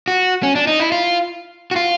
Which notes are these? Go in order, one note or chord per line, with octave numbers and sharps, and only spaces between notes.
F#4
C#4
D4
D#4
E4
F4
F#4
F4